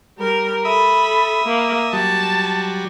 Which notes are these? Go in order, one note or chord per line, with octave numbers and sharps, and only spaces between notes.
G3 A#4
A4 E5 B5 D#6
A#3
F#3 G3 A5